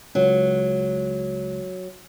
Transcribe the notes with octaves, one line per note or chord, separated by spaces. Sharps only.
C#2 F#3